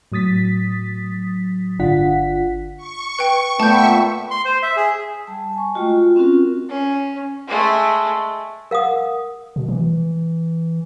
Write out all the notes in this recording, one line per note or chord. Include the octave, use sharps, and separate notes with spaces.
A2 F#3 D#6 A6 B6
G1 D3 D4 F4 F#5 B6
C#6
B4 G5
A#2 A3 B3 E5 G5 A5 C#6 G6
C6
C5
E5
G#4
G3 A5
G#5 C#6
G#3 A3 F4 F#4 D#5 G5
F4
C4 C#4 F4 F#4 A#4
C#4
G#3 A3
A#4 F5 F#5 D#6
B2
E3